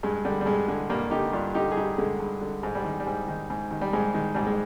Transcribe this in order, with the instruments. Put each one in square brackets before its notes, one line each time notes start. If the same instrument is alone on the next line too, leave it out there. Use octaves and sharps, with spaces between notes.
[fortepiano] G2 G#3
D3 G3
G3
G2 G#3
D3 G#3
G2 G3 A#3
D3 D#4 G4
G2 D4 F4
D3 D#4 G4
G#4
G2 D#4 G4
D3 G#3
G2
D3
G#2 G#3
G3
D#3
G3
G#2
D#3
G#2
D#3
G3
G#2 G#3
D#3
G#2 G3
G#3